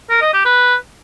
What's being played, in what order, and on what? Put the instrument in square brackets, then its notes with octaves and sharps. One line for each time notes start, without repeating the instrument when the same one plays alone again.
[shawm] A#4
D#5
G4
B4